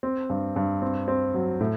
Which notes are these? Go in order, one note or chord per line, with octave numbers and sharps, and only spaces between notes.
C4
G2
G2
C4
C4
F#3
A2